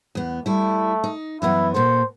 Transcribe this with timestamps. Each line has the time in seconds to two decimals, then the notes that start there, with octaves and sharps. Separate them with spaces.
0.15 E2 B3
0.46 G3 A3 E4
1.04 D#4
1.42 F#2 E3 B3 E4
1.74 A#2 F#4 A4 C5